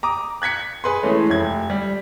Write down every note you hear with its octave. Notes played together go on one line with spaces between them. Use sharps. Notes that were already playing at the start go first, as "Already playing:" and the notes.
A#5 D6 D#6
F#6 G#6 B6 C#7
G#4 B4 C6
E3 G#3 A3 C#4
F1 G#6
G3